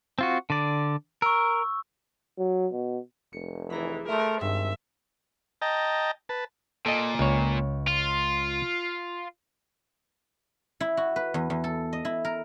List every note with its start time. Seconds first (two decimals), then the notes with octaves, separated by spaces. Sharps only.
0.19 C4 F4 F#4
0.50 D3 D5
1.22 A#4 C#6 E6
2.38 F#3
2.72 B2
3.33 F1 C#7
3.70 E3 G#4 A#5 B5
4.08 A3 A#4 E5 C6 D#6
4.41 G#1 G2 E5
5.62 D#5 G5 A5 A#5
6.29 B4 A5
6.86 A#2 A4 D#5
7.19 C#2 C#5
7.87 F4
10.80 E4
10.97 F#4
11.16 B4
11.34 E2
11.50 E2
11.64 A4
11.93 D#5
12.05 E4
12.25 A#4